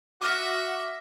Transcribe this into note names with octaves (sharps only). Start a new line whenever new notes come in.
F#4 E5 D6 F6 A#6